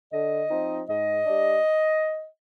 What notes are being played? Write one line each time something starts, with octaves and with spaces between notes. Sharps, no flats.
D3 D#5
F3 C4 D#4
G#2 D#5
G3 D4